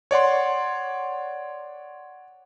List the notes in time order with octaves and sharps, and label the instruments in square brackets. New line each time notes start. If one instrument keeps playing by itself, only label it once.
[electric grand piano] C#5 D5 F#5 C6